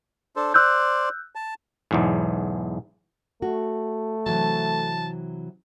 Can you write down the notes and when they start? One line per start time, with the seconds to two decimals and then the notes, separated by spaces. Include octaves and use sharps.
0.36 D4 A4 C5
0.54 C5 D5 E6 F#6 G6
1.35 A5
1.91 B1 E2 G#2
3.42 A3 F#4
4.26 C3 E3 F#3 A5